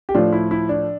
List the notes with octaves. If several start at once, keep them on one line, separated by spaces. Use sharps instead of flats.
G4
A2 F3 D4 F4
E4
E4
D4